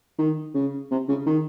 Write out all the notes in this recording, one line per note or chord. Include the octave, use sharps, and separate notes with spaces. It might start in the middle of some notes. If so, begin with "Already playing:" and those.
D#3
C#3
C3
C#3
D#3